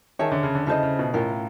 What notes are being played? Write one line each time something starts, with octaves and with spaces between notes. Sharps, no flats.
D#3 G#4 C#5 E5 A5
D3
C#3
D3
C#3 E4 A4 C5 D#5
C#3
B2
A2 C#4 F4 A#4